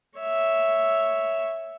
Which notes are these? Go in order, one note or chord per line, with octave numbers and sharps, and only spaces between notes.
C#5 E5